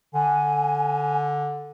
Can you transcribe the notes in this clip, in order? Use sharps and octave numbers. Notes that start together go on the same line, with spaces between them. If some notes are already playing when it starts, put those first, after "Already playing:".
D3 G#5